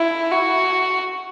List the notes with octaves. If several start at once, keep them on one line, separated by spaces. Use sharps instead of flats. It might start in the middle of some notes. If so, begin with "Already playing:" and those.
Already playing: E4
F#4